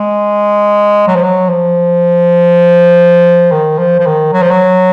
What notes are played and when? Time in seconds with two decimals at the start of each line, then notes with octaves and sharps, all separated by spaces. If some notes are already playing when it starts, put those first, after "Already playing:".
Already playing: G#3
1.07 F#3
1.15 F3
1.23 F#3
1.49 F3
3.51 D#3
3.78 F3
4.00 F3
4.06 D#3
4.33 F#3
4.42 F3
4.51 F#3